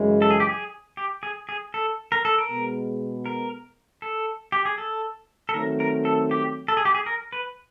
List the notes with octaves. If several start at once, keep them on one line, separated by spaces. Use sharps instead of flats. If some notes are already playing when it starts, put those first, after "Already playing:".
Already playing: F#2 C#3 E3 G#3
A4
G#4
G4
G#4
G4
G#4
G#4
A4
A#4
A4
A#4
B2 G#3 B3
A#4
A4
G4
G#4
A4
A4
D#3 F#3 A3 C4 A#4
A#4
A4
G4
A4
G#4
G4
G#4
A#4
B4